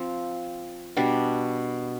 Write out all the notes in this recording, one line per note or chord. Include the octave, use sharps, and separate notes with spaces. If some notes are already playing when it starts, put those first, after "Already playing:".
Already playing: F3 C4 F4
B2 G3 D4